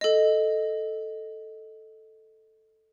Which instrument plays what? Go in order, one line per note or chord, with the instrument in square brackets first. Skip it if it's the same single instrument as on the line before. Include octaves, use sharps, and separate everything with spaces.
[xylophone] A4 D#5